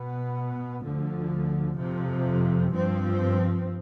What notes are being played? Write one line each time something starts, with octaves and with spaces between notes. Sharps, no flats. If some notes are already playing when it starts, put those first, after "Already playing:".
Already playing: B2 B3
D2 D3 F3
F2 C3 F3
G2 F3 C4